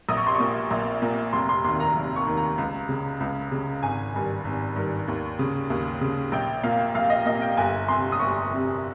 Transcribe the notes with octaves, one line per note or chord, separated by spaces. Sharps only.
A#1 D#6
C#6
C6
A#2 C#6
A#1
A#2
F1 C6
C6
D#2 D#3 C6
A#5
F1
C#6
D#2 D#3
A#5
C#2
C#3
C#2
C#3
G#1 G#5
G2 D#3
G#1
G2 D#3
D#2
C#3
D#2
C#3
A#1 G5
A#2 F5
A#1 F5
D#5
A#2 D#5
G5
G1 G#5
F2 C3 C6
D#6
G1 C#6
F2 C3